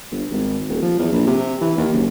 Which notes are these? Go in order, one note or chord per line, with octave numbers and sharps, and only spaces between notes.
G1
G#1
D#1
F3
E2
A#1
C3
E3
D#2
F#1